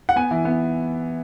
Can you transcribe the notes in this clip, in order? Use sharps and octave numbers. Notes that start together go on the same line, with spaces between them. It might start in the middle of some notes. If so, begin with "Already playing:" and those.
F#5
B3 G#5
E3
B3